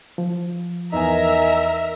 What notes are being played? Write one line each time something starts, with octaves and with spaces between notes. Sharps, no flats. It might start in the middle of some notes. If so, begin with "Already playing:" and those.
F3
E2 D#4 A#4 E5 G#5 A#5